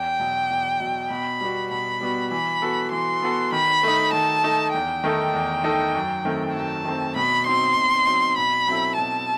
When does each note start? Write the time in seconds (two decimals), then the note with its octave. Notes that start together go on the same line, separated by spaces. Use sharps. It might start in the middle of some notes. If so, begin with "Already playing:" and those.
Already playing: E2 G5
0.20 B2 F#3
0.50 E2
0.80 B2 F#3
1.10 B2 B5
1.41 G3 B3 F#4
1.71 B2 B5
2.01 G3 B3 F#4
2.31 E3 B5
2.62 B3 F#4 A4
2.92 E3 C6
3.22 B3 F#4 A4
3.52 D#3 B5
3.83 A3 D#4
4.13 D#3 A5
4.44 A3 D#4
4.73 E2 G5
5.04 D#3 A3 D#4 A4
5.34 E2
5.64 D#3 A3 D#4 A4
5.95 F#2
6.25 D#3 A3 C4
6.55 F#2 A5
6.85 D#3 A3 C4
7.16 B2 B5
7.46 F#3 C4 D#4 C6
7.76 B2
8.06 F#3 C4 D#4
8.37 B2 B5
8.68 F#3 C4 E4 A4
8.97 B2 A5